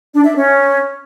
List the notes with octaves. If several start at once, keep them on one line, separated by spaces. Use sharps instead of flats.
D4
E5
C#4